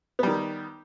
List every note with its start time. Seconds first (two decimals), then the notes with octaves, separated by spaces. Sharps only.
0.19 B3
0.23 G3
0.27 D#3